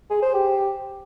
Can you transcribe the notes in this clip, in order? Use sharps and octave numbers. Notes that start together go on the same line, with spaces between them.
G#4
C5
G4